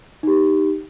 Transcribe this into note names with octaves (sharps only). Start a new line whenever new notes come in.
D#4 G4